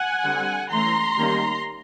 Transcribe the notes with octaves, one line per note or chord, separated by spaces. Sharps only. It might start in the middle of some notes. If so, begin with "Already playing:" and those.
Already playing: F#5 G#5
D3 G3 C4
E3 A3 C#4 A#5 C6
D#3 G3 A#3 C#4